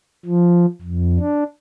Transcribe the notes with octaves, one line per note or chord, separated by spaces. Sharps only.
F3
F2
D4